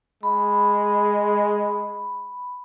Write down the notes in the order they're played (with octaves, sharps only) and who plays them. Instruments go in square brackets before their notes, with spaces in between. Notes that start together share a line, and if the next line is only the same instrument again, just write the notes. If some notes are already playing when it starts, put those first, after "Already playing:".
[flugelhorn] G#3 [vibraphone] B5